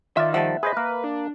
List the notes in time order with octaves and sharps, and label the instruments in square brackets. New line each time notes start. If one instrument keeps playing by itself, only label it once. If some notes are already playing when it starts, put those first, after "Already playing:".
[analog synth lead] D#3 [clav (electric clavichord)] F4 D5 [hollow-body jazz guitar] E5
[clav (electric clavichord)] F3 G3 A5 [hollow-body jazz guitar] E5 F#5
[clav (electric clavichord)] G#4 C5 D#5 [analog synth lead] B4
[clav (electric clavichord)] A#3 A#4
[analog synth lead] D4